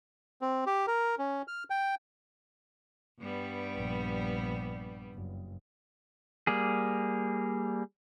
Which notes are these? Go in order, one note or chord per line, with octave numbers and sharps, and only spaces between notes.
C4
G4
A#4
C#4
F6
G5
G2 G3 B3
A#1
F#1
G3 A#3 G#4